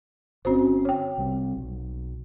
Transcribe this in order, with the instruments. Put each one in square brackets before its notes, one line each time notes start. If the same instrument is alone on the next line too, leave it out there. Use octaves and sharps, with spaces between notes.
[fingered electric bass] G1 C#4 [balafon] C4 F#4 C5
[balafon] C#5 G5
[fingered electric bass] C2 G3 C4
B1